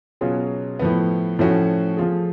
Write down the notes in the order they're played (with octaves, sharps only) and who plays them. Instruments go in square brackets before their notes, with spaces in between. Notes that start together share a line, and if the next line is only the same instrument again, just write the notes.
[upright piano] B2 F#3 C#4 F4 G#4
A2 F3 B3
A2 F3 A3 C#4 F#4
F3 A3 F4 G#4